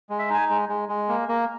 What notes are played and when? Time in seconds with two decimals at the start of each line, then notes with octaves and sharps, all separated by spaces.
0.10 G#3
0.19 E5
0.30 D#4 G#5
0.50 G#3
0.69 G#3
0.89 G#3
1.09 A#3
1.29 A#3